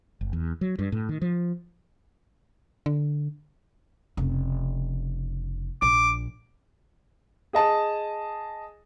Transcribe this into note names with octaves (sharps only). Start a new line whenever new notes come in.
F#1
E2
F#3
G2
A2
D#3
F3
D3
F1 C#3
A#1 D6
G#4 D#5 A5